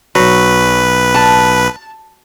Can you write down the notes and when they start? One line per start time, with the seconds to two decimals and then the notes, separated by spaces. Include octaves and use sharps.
0.15 B1 F#3 B4
1.15 A5